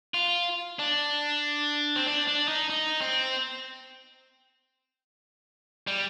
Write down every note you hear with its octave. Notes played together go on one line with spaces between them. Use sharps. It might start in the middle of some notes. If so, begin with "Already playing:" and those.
F4
D4
C4
D4
D4
D#4
D#4
C4
G3